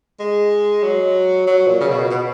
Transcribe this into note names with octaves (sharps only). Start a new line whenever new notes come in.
G#3
F#3
F#3
A#2
C#3
B2
B2